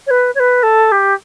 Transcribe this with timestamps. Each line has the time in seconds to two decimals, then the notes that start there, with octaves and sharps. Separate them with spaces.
0.07 C#5
0.10 B4
0.35 C#5
0.39 B4
0.63 A4
0.91 G4